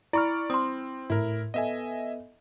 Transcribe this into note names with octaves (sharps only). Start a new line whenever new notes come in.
E4 D5 B5 C#6 F6
C4 C6 D#6
A2 E4 A#4
B3 A4 D#5 E5 G#5